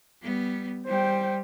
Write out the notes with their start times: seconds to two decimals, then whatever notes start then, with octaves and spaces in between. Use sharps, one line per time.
0.22 G3 B3
0.86 G3 C5 G5